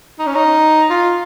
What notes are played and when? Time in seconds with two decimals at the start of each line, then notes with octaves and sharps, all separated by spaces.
0.19 D#4
0.27 C#4
0.35 D#4
0.90 F4